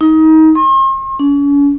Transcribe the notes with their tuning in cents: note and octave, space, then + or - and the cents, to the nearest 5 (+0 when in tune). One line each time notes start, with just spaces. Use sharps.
D#4 +25
C6 +45
C#4 +40